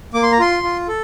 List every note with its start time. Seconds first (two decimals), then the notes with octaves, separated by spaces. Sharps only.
0.14 A#3 D6
0.23 C6
0.32 A#5
0.39 F4 C6
0.63 F4
0.88 A4